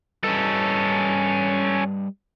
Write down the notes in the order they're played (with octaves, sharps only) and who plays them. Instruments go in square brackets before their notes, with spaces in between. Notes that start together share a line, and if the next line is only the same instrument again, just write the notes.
[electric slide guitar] G3 B4 D#5 [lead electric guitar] C#4 A4